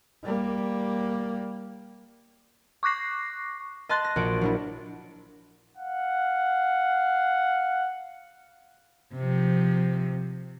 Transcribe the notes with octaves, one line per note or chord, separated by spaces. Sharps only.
G3 A#3
C#6 D6 F#6 A#6 C7
D#5 A5 C6 F#6 A6
A#6
A#1 F#4 D7
F#3 D4 E4
F5 F#5
C3 F3